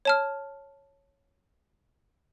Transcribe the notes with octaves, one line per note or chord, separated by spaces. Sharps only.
C#5 A5 F6